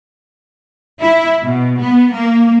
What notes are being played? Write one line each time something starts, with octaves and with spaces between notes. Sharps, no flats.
E4
B2
B3
A#3